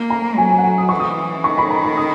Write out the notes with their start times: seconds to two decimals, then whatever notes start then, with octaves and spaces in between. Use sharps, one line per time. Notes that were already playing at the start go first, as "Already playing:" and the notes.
Already playing: A#3
0.10 A#5
0.37 F#3 G#5
0.51 G#5
0.58 F#5
0.64 G#5
0.78 D#6
0.89 E3 C#6
1.00 D#6
1.44 D#3 C#6
1.58 B5
1.71 A#5
1.84 B5
1.97 D#6